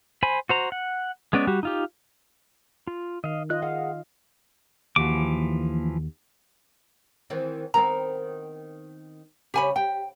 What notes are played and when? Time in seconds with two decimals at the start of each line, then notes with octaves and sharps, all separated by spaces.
0.23 C5 G#5 B5
0.49 F#4 C5 A#5
0.72 F#5
1.33 G#3 B3 C#4 D5
1.47 G3 F#4 G4
1.63 D#4 F4 G4
2.87 F4
3.24 D#3 D#5 F5
3.50 F4 D#5 F#6
3.62 G#4 F5 F#5
4.96 D#2 E3 F3 A#3 F#4 D6
7.30 D#3 E3 C4
7.74 D#3 B3 C4 A#5
9.54 C#3 G4 B4 C#5 G#5 B5
9.76 G4 G5